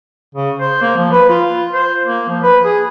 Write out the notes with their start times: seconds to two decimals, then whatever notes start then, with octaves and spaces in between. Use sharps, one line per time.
0.35 C#3
0.60 C5
0.82 A#3
0.97 F3
1.12 B4
1.30 F4
1.73 C5
2.05 A#3
2.29 F3
2.43 B4
2.64 G#4